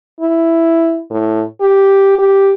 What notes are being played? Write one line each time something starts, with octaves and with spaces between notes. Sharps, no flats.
E4
A2
G4
G4